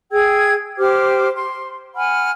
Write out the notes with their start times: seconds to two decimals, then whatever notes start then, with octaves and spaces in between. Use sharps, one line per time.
0.12 G#4 G5 E6 G#6
0.78 G4 C5 D6 F6
1.34 C6
1.96 F#5 G#5 B5 F6